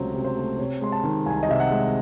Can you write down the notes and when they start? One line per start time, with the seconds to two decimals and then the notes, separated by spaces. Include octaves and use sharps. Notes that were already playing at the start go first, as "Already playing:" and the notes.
Already playing: C#2 C3 F#3 A3 C5
0.14 C3
0.24 C5
0.37 A3
0.59 C3 C#5
0.81 G#3 C6
0.92 A5
1.03 D#3
1.26 C2 G#5
1.43 D#5
1.48 C3 E5
1.60 F#5
1.71 G#3